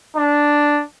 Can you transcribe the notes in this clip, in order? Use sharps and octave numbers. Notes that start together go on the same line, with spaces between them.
D4